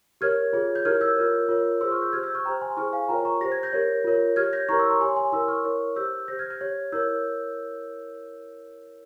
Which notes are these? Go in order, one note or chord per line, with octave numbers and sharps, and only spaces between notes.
G4 A#4 C#5 F6 G#6
F4 G#4 C#5
G6
E4 G4 A#4 C#5 F6 G#6
E6 G6
F4 A#4 C#5
F4 A#4 C#5
F4 G#4 C5 C6 E6
C#6 F6
E6 G6
G4 C5 F6 G#6
E6 G6
C#6 F6
G4 C5 G5 A#5
G#5 C6
E4 G#4 C5 C#6 F6
F5 G#5
F4 A#4 C#5 G5 A#5
A#5 C#6
G4 C5 A#6
G#6
G6 A#6
G4 A#4 C#5
F4 A#4 C#5
G4 C#5 F6 G#6
G6 A#6
E4 G4 A#4 C#5 A#5 C#6
C6 E6
A#5 C#6
G4 C#5 G#5 C6
G#5 C6
E4 A#4 C#5 C6 E6
C#6 F6
E4 A#4 C#5
G4 C5 E6 G6
G4 C5 G6 A#6
F6 G#6
F6 G#6
G4 C#5
E4 A#4 C#5 E6 G6